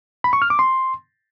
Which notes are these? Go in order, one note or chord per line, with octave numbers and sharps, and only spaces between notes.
B5
C#6
F6
D6
C6